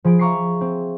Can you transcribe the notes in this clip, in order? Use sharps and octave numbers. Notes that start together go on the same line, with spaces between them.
F3 G#4 B5 D7
E5 F5 A#5 C#6 D6 C7
C4